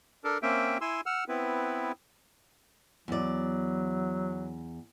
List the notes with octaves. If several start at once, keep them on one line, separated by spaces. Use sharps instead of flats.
D4 A4 A#4
A#3 C4 C#4 E5 G5
E4 G#5 C6 E6
F#5 E6 F6
B3 C4 E4 B4
E2 F#3 D5